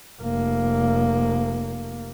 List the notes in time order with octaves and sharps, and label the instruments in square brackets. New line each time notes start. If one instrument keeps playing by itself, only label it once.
[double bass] F1 A#3